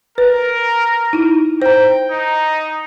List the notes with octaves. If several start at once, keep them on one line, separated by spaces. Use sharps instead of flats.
A#4 B4
D#4 E4
C5 G5 A#5
D#4